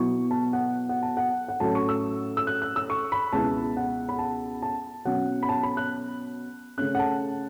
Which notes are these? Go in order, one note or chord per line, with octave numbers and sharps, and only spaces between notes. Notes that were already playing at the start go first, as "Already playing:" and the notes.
Already playing: B2 F#3 B3 E4 C#6
A5
F#5
F#5
A5
F#5
F#5
A2 F#3 C#4 A5
C#6
E6
E6
F#6
F#6
E6
C#6
B5
C#2 B2 B3 E4 A5
F#5
B5
A5
A5
B2 F#3 C#4 F#5
B5
A5
B5
F#6
C#3 A3 C#4 F#6
F#5
A5